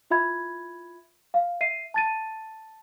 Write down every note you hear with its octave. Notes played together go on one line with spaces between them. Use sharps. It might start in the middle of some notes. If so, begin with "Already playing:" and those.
E4 F4 E5 B5 G#6
F5
E5 C7 D#7
A5 A6 D#7